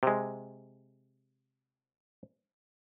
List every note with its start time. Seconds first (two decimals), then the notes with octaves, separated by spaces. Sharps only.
0.03 C3 G#3